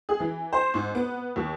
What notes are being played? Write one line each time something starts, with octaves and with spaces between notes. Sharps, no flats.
G#4
E3
C5
G#2
B3
D#2